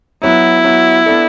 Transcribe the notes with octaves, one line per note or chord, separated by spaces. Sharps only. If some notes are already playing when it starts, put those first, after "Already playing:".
F#3 B3 E4 F#4
F#3 B3 F#4
B3 D4 A4